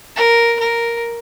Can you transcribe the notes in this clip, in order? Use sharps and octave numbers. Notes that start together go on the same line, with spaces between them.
A#4
A#4